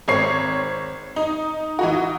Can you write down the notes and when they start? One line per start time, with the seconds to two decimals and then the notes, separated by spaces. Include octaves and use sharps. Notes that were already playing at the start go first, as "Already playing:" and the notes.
0.08 G#1 C4 C#5 C7
1.16 D#4
1.79 E3 D#4 F#4